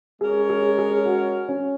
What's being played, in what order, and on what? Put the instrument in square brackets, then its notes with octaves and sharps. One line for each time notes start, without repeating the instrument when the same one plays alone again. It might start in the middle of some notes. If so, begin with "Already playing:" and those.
[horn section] G#3 C#4 A#4 C#5 [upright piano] G#4
[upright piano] G#4
G#4
F#4
C#4